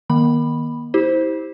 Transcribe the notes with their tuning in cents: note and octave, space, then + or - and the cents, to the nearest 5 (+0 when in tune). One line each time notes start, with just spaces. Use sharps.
D#3 +0 A#3 +45 B5 +0
E4 -30 G4 +0 C5 +0